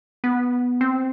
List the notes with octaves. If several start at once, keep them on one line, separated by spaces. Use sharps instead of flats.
B3
C4